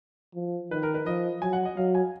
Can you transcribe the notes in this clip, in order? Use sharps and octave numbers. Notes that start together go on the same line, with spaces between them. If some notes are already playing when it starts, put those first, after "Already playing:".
F3
D#3 B4
A#4
B4
F3 D#5
F#3 G#5
F#5
D#5
F#3 F5
G#5